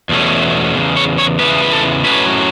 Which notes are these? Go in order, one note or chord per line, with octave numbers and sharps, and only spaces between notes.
E2 B2 A3 C#4
E2 C#3
C#5
C#5
E2 C#3 E3 B3 B4
B4
A4
A2 F#3 C#4 B4